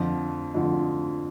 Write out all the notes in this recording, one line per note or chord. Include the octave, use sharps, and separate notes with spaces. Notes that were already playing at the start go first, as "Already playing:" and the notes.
Already playing: F2 D3 F3
F2 D3 F3